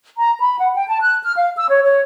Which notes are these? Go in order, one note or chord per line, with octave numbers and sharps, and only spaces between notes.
A#5
B5
F#5
G5
A5
F#6
F6
F5
E6
C#5
C#5